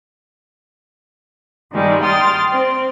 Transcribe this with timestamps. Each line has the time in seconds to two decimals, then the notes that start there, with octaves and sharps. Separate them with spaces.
1.72 G2 D#3 G3 G#3
2.04 G5 C6 D#6 F6 A6
2.51 C4